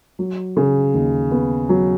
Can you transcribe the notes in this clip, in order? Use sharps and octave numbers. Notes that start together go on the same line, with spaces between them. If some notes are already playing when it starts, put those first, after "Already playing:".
F#3
C#3
D#2
B3
F#3